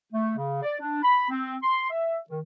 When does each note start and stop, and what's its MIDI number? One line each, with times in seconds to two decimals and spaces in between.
0.12 0.36 57
0.37 0.62 49
0.63 0.75 74
0.80 1.01 62
1.03 1.29 83
1.29 1.55 60
1.63 1.87 84
1.90 2.18 76
2.29 2.39 51